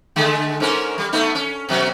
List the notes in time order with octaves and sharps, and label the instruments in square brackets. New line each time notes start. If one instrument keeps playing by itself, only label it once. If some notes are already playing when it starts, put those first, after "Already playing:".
[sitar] D3 G#3 A3
G#2 C#4 A#4
G3
A3 B3 D#4
C#4
B2 F#3 C#4